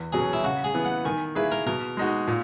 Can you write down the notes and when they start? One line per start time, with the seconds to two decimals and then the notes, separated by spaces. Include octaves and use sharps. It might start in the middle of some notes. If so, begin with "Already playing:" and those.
Already playing: E2
0.12 B2 F#3 C#4 G#4
0.33 E4
0.43 C#3 F#4
0.64 G#4
0.74 E3 B3
0.85 F#5
1.05 D#3 G#5
1.35 A#3 E4 G#4 B4
1.52 A#4
1.66 B2 A#4
1.97 G#3 D#4 F#4
2.28 A#2